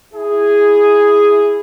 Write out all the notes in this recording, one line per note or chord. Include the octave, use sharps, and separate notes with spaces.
E4 G#4